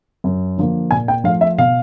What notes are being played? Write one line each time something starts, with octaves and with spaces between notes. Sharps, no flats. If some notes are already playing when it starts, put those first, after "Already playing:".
F#2
D3 F3 A#3
A#2 G#5
G5
F3 A3 F5
E5
B2 F5